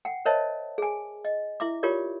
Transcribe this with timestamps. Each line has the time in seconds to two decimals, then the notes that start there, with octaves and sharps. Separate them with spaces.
0.05 F#5 G5
0.25 A#4 C5 C#5 D#5 E5 A5
0.78 G#4 G#5
1.25 D#5
1.60 E4 E5 D6
1.83 F4 G4 A#4 C#5 D5